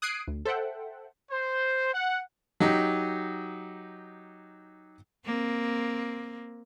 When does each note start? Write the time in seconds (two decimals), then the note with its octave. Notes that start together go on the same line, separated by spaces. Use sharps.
0.02 D#6 F#6 G#6 C7 D7 D#7
0.28 D2
0.45 A4 C5 E5 F#5 G5
1.32 C5
1.94 F#5
2.60 F#3 D#4 G4
5.25 A#3 C4